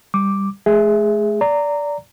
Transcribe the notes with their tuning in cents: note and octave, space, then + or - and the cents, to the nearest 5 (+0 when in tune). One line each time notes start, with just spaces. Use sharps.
G3 +5 D6 +0
A3 -40 G#4 +0 E5 +0
D5 -15 A#5 -15